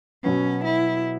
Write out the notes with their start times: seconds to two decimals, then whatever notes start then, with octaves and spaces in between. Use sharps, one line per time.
0.24 B2 F#3 B3 C#4
0.65 E4